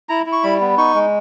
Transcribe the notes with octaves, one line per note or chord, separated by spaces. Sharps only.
E4 A#5
E4
C#6
G3 B5
B3
D#4 C#6
G#3